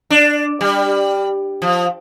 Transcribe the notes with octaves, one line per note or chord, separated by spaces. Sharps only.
D4
G3
F3